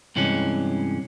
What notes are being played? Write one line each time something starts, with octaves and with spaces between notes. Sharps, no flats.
G2 C3 E3 G#3 C#4